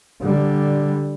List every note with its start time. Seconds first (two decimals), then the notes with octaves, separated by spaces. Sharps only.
0.21 D3 G3